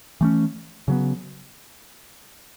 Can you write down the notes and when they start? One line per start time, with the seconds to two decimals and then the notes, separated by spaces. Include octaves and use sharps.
0.21 E3 A3 C#4
0.88 C#3 F#3 B3